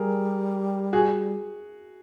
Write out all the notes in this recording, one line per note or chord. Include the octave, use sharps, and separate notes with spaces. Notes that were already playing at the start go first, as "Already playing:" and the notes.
Already playing: G3 G#4 A#4
F#4 G#4